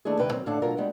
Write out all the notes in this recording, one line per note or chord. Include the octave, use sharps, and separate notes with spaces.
D#3 A3 D4 E4 G#4
D2 C3 D#3 G#3 B4 G5
D#3 F#3 C4
A2 D3 D4 A4 F5 F#5
B2 F#3 F4 A#4 A#5
G3 G#3 B3 F#5 G5